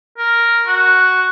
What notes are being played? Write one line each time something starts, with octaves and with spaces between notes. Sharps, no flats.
A#4
F#4